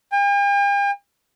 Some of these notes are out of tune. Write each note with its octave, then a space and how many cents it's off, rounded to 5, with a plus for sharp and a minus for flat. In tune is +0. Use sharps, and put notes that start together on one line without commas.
G5 +45